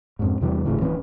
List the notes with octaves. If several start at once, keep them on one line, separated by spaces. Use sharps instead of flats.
F2 G#2
E2 C3 E3 G3
G1 A2 C#3 E3
D1 E3 C4 C#4